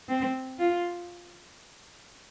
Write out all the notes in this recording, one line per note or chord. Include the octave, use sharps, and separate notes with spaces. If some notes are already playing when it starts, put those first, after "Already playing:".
C4
F4